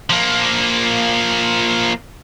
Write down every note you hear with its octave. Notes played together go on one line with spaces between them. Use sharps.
F3 A#3